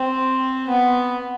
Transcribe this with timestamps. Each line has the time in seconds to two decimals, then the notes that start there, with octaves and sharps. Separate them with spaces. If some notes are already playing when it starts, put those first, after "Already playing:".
Already playing: C4
0.68 B3